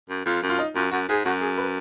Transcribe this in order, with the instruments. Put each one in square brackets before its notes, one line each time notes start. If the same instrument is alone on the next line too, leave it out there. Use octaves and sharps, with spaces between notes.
[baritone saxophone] F#2
[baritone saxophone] F2 [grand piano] F4
[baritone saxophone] F#2
[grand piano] F4
D#4
[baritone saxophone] F#2 [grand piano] F4
[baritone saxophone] F#2 [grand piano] F#4
[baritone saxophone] G#2 [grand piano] G#4
[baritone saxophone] F#2 [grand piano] F#4
[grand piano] G#4
B4